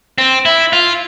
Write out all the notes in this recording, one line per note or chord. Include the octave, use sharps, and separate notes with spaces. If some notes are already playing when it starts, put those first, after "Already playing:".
C4
E4
F4